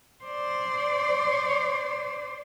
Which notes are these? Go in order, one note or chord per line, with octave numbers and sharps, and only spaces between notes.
C5 D5